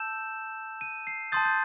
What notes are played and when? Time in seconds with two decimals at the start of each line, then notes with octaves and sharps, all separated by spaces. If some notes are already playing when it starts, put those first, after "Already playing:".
Already playing: A5 E6 G6 E7
0.81 D#7
1.07 C7
1.32 A5 C6 D#6 G6 A6
1.45 G6